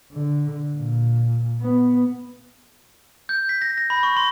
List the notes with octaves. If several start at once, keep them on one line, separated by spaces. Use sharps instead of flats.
D3
A#2
B3
G6
B6
A#6
A#6
B5
C#6
C6